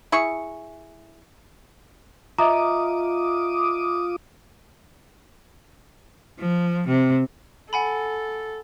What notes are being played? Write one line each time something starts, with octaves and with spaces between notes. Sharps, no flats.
E4 G#4 C#6
F4 D#5 E5 A#5 D6 D#6
F3
C3
A4 F#5 G#5 B5